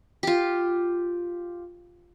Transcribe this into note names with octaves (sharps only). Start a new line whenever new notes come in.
F4 G4